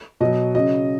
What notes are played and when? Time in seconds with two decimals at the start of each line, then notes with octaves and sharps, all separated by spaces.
0.20 B2 F#3 D#5
0.55 C#3 F#3 D#5